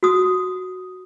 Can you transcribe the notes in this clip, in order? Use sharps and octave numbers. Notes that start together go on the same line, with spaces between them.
F#4 D#6